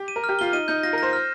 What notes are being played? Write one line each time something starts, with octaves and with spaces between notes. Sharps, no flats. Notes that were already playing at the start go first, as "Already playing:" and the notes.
Already playing: G4
D#7
A#4
F6
G4
F4 G7
D#4 D#7
D#4 G6
F4 A#6
A#4
C5 A#6
F6